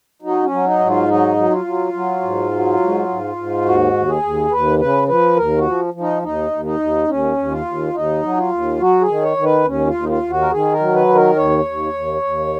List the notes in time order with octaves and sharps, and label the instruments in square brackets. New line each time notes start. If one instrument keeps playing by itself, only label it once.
[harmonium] F#3 D#4
C#4
F#3
D#4
G#2
F4
F#3 D#4
F#3
F4
F#3
F#3
G#2
F#3
G#2
G#2
G#2
D#2 F#4
D#2
G#4
D#2
D#2 B4
C#3 B4
F3 B4
D#2 A#4
F#4
F3
F3
D#4
D#2 D#4
D#2
D#4
D#2
D#2 C#4
D#2
F4
D#2
D#2 D#4
F#3
F4
D#2
F#3 F#4
G#4
D#3
C#5
D#3
B4
D#2 C#4
F4
D#2
D#4
F4
D#2
F#4
A#4
D#3 G#4
A#4
F#3
B4
D#3
A#4
D#2 C#5
D#2
D#2
D#2